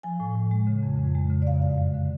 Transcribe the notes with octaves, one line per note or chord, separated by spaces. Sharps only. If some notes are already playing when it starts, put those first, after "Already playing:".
F3 G#5
A2
A2
G#3
C#3
F2
F2
G#3
C#3
D5
F#2 F5
F#2 F5
G#3
D3